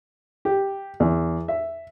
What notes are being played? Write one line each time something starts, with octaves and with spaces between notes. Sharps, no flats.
G4
E2
E5